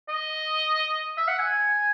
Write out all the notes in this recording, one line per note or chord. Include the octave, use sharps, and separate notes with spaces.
D#5
E5
F#5
G#5